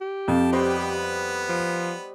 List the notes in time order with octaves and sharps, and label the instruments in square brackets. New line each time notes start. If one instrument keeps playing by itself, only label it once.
[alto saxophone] G4
[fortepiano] F2 [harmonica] A5
[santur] G3 C5 D#5 [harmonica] B3 B4
[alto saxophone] F3